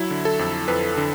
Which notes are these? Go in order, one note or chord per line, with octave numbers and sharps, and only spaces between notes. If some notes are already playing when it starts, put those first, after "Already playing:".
Already playing: F#3 E4
D3
A4
F2
F2 B4
D3